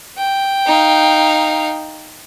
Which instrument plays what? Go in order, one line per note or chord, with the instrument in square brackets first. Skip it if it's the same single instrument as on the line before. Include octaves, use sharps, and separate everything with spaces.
[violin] G5
[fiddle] D#4 F5